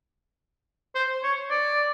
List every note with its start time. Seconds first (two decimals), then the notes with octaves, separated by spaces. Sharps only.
0.95 C5
1.23 C#5
1.50 D5